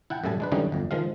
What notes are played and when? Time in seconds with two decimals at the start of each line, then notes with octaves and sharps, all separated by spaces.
0.10 E4 F#5 G5 A5
0.24 F#2 A2 G3 E5 G#5 A5
0.40 G#3 D4 B4
0.52 F#2 D3 E3 G3 C#4 D#4
0.72 G1 F2
0.91 D#3 F3 G#3 F5